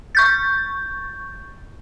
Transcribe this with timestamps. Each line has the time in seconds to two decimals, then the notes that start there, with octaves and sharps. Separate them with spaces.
0.15 C#6 G6 A6